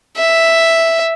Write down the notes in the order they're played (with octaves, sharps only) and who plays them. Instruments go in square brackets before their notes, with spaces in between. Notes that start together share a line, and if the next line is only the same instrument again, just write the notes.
[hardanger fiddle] E5